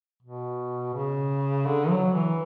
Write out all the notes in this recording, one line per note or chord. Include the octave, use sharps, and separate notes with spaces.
B2
C#3
D3
F#3
E3